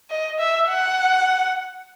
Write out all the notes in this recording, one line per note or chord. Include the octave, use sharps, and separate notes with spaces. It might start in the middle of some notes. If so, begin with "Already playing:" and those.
D#5
E5
F#5